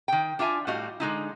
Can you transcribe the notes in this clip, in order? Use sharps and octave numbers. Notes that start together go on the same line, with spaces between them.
D#3 G5
D4 F4 E5 G#5
A2 G3 F#4 D#5 F5
D3 G#3 D#4 E4